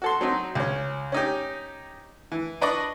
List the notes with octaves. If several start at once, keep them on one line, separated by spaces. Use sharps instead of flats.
F#4 A4 C6
F#3 C4 D#4
C#2 C#4
C#4 D#4 G4
E3
D4 B4 D5 D#5 C#6 D6